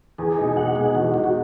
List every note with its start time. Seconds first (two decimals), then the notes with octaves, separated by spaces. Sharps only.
0.18 E2 G#4
0.38 B2 G#3 D#4
0.57 E2 F#5
0.75 B2 G#3 D#4 G#4
0.95 E2 F#4
1.14 B2 G#3 D#4 F#4
1.24 F#4